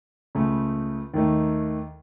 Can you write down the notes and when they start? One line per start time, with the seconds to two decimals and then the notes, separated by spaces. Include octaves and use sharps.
0.35 C#2 C#3 A3
1.14 D#2 D#3 A3 D#4